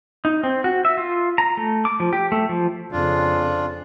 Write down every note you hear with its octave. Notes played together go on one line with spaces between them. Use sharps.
D#4
C4
F#4
E5
F4
A#5
A3
D6
F3
G4
A3
F3
F2 C#3 D4 F4